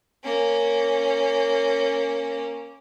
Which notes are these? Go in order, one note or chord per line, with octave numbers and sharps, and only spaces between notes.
A#3 C#4